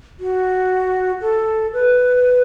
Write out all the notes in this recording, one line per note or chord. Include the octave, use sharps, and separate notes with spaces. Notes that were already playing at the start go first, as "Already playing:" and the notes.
F#4
A4
B4